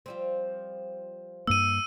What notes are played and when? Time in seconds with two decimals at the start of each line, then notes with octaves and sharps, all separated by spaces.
0.06 F3 G3 C4
1.47 G2 A#3 E6 D#7